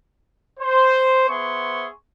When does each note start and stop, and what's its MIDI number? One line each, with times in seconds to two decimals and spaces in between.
0.60 1.28 72
1.29 1.87 59
1.29 1.87 68
1.29 1.87 72
1.29 1.87 76
1.29 1.87 84
1.29 1.87 85